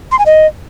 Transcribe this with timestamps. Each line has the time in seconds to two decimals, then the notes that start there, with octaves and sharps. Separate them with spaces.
0.11 C6
0.19 G#5
0.26 D#5